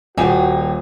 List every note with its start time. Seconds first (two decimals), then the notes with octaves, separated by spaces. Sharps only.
0.18 D#1 D#3 G3 A#3 F#4 G#5